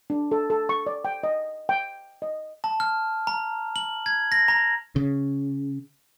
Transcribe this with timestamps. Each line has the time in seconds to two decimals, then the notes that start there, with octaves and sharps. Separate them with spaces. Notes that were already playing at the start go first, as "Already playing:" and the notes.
0.10 D4
0.32 A4
0.50 A4
0.69 C#6
0.87 D5
1.05 G5
1.23 D#5
1.69 G5
2.22 D#5
2.64 A5
2.80 F6
3.27 A#5
3.76 F#7
4.06 G#6
4.32 A#6
4.48 A#5
4.96 C#3